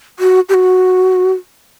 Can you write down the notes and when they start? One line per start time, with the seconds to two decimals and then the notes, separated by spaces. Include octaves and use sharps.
0.19 F#4
0.49 G4
0.54 F#4